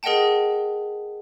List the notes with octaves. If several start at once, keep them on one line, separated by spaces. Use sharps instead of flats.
G#4 A#4 D#5 F#5 G5 A5